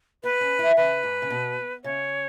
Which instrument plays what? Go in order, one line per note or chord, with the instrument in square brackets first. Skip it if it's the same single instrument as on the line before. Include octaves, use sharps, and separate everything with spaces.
[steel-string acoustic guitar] B3 [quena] B4
[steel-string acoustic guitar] C#4
E4
[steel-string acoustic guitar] C#3 [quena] B4
[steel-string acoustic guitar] G#2
C#3
B2
[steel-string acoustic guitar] C#3 [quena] C#5